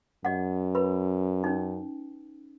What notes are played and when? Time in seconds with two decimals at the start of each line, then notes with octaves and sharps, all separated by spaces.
0.25 F#2 D#5 F#5
0.75 B4 B5
1.44 C#4 D#4